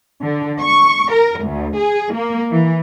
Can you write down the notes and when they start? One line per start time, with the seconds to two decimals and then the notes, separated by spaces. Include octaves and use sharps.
0.23 D3
0.61 C#6
1.11 A#4
1.44 D2
1.76 G#4
2.14 A#3
2.51 E3